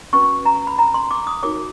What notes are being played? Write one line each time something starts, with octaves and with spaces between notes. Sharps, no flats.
C#4 F#4 B4 C#6
A#5
B5
A#5
C6
D6
D#6
D#4 F#4 A#4 C#5 D6